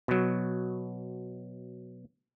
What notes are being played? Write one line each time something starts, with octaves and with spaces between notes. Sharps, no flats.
B2 F#3